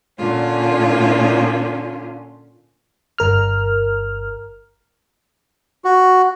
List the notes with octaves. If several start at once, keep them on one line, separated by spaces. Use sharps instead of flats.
A#2 D3 C#4 F4
G1 A#4 F6
F#4